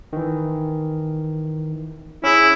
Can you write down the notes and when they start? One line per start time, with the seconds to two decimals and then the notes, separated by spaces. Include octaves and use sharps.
0.13 D#3 E3
2.24 C#4 E4 G#4